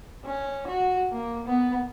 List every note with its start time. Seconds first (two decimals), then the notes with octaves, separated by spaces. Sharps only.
0.25 C#4
0.68 F#4
1.12 A#3
1.46 B3